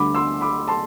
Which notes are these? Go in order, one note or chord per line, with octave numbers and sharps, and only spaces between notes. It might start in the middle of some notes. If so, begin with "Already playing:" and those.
Already playing: D2 D3 G3 B5 D6
C6 E6
B5 D6
A5 C6